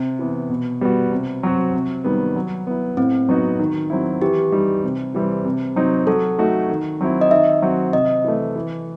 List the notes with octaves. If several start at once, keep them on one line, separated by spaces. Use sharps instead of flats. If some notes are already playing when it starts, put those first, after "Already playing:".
Already playing: C3
E3 B3
B2
G3 B3 F#4
C3
F#3 C4 F#4
C3
D#3 G3 B3
F#3
B3 E4
A2 C4
F#3 B3 D#4 F#4
D#3
F#3 C4 E4
E3 G4
G3 D#4
C3
E3 G3 C4
C3
F#3 C4 D#4 F#4
F#3 A4
A3 D#4 F#4
D#3
F#3 C4 E4
D#5
D#3 E5
F#3 C4 F#4
C3 D#5
E3 A3
E3